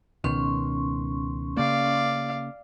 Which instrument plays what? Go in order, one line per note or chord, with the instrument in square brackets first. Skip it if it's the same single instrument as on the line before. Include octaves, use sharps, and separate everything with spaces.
[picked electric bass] C#2 B2 D#3 [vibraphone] C#4 C6 C#6
[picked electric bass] C#3 A#3 [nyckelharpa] D5 F5